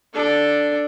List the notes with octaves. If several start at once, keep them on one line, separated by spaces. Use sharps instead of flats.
D4 A4